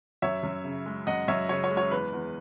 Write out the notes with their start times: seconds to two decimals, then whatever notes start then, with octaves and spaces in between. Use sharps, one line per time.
0.22 F#2 C#5 E5
0.43 F#2
0.64 C#3
0.86 G#3
1.07 F#2 D#5 F#5
1.28 F#2 C#5 E5
1.49 C#3 C#5
1.64 C#5
1.71 G#3
1.77 C#5
1.91 E2 B4
2.13 E2